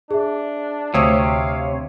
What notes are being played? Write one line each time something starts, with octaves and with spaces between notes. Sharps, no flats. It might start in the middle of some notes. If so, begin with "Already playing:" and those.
D4 G#4 E5
D2 C3 C5 C#5 F5 D#6 E6